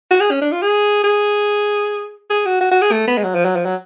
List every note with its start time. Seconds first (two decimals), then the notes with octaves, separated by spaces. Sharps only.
0.11 F#4
0.21 G#4
0.31 C#4
0.42 D4
0.52 F4
0.63 G#4
1.04 G#4
2.30 G#4
2.46 F#4
2.61 F#4
2.71 F#4
2.82 G#4
2.92 A3
3.08 B3
3.18 G#3
3.24 F#3
3.35 F3
3.45 F#3
3.56 F3
3.66 F#3